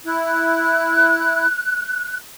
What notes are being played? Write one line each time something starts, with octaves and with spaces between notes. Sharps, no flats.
E4 F#6